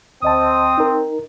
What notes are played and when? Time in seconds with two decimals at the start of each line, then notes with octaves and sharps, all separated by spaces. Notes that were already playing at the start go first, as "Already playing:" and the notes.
0.22 D2 C4 D#5 A5 D#6
0.78 D#4 A#4